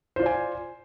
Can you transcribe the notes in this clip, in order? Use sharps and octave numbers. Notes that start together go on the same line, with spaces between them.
F4 C5 D5 G#5